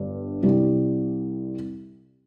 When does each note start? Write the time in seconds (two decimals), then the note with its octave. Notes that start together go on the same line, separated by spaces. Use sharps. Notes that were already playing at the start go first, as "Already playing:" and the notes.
Already playing: G1 G2 G3
0.42 C2 C3 G3 C4 G4